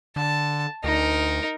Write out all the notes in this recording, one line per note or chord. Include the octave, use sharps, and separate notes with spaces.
D3 A5
D2 D#4 A#4